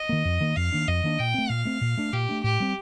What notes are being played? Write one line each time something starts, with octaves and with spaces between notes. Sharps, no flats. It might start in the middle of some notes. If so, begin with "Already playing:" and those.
Already playing: D#5
D#3 A#3
F2
D#3 A#3
F2 F5
D#3 A#3 D4
F2 D#5
D#3 A#3 D4
A#2 G5
A3 C4
A#2 F5
A3 C4
A#2
A3 D4
A#2 G4
A3 D4
A2 G4
G3 C4